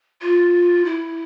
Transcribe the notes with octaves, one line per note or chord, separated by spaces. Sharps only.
F4
E4